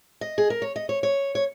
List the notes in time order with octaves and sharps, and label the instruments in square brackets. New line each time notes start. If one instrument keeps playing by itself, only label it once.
[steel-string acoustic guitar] D#5
G#4
A#4
C#5
D#5
C#5
C#5
C#5